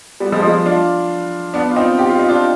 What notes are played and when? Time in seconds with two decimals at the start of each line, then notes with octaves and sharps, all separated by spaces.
0.20 G3 B3
0.32 F3 G#3
0.43 F3 G#3
0.66 D4 F4
1.54 B3 D4
1.71 F4
1.76 C4 D#4
1.99 G4
2.09 F4
2.19 D#4
2.29 D4 F4